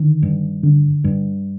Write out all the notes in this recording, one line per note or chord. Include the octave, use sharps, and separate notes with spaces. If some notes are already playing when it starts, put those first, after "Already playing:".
Already playing: D3 D#3
G2
D3
G2